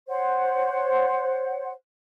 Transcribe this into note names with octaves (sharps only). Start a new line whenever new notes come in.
C5 C#5 F#5